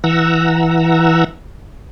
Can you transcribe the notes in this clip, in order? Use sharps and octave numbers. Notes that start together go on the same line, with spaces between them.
E3 F#5 A#5 E6